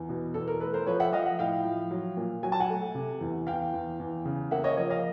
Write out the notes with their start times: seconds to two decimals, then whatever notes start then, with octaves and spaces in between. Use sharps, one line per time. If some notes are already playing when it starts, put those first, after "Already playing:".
Already playing: E2
0.09 B2
0.34 E2 A4
0.48 A#4
0.60 A3 A4 B4
0.73 A#4 C5
0.86 F3 B4 C#5
1.00 E5 F#5
1.12 F3 D#5 F5
1.25 E5 F#5
1.39 A2 F5 G5
1.64 F3
1.91 F#3
2.17 A#2
2.43 F#3 G#5
2.52 A5
2.60 F#5 G#5
2.70 A3
2.95 C3
3.21 E2
3.47 E2 F5 G5
3.73 E2
4.00 E2
4.25 C#3
4.51 A#3 E5 F#5
4.64 C#5 D#5
4.77 F3 C#5 D#5
4.90 D#5 F5